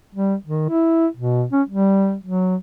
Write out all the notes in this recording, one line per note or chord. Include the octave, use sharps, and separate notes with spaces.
G3
D#3
E4
B2
C#4
G3
F#3